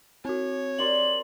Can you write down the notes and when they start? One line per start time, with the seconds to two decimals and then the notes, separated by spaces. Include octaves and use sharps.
0.25 C4 F#4 C#5
0.79 A#4 C5 D5 F#7